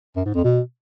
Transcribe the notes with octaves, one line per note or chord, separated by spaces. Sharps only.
F#2
G#2
F2
B2